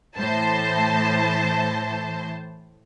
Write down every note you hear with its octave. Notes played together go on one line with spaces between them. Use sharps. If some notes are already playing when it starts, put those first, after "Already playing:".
A2 E3 C5 A5